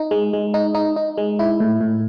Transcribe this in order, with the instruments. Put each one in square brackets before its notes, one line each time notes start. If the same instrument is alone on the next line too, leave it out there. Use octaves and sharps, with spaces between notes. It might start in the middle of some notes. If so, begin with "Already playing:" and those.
Already playing: [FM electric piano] D#4
G#3
G#3
D#4
D#4
D#4
G#3
E4
A2
A2